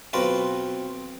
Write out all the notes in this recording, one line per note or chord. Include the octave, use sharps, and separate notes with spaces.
B1 C4 F4 F#4 B4